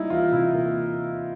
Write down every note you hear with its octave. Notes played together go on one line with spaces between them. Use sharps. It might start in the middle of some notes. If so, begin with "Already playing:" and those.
Already playing: G3 A#3 D#4 E4
E3 F4
C3 E4
A#3